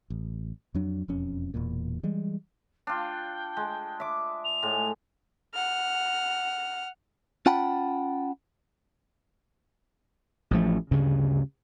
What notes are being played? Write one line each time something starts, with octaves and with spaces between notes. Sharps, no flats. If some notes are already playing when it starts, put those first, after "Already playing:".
A1
F2 F#3 D4
E1 F2 C#4
E1 E2 A#2
E3 G3 G#3
D4 F4 G5
G#3
E5 D6
F7
A2 G#3 G#4
F#5 F6
C#4 F4 F#5 G5 A5 B5
A1 F3 A3
D2 G2 C#3